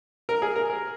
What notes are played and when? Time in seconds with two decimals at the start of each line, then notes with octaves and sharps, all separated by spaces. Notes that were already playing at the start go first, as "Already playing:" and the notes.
0.29 A#4
0.42 G#4
0.56 A#4
0.70 A#4